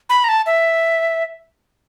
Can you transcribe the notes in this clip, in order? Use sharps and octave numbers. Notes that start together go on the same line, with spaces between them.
B5
A#5
A5
E5